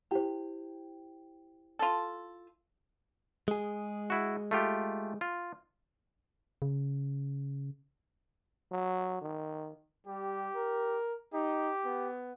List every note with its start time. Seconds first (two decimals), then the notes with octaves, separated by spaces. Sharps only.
0.11 E4 G4 C5
1.79 F4 A4
3.48 G#3 G#4
4.10 E4 F#4
4.51 A3 F4 G4
5.21 F4
6.62 C#3
8.72 F#3
9.22 D#3
10.07 G3 G4
10.55 A#4
11.34 D#4 G4
11.85 B3